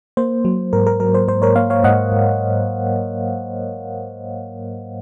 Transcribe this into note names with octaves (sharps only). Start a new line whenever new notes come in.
A#3 C5
F#3
G#2 A#4
A#4
F#3 A#4
C5
G#2 C5
A#4 C#5
A#3 C#5 F5
C#5 F5
G#2 D#5 F#5
G#2